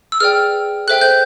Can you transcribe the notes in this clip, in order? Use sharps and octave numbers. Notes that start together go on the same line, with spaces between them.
E6
G#4 B4 D5 G5 F6
A4 C5 E5 G5 F#6
G6